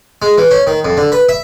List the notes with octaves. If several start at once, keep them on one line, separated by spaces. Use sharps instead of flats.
G#3
E3
C#4
D#3
F2
D3
B4
E5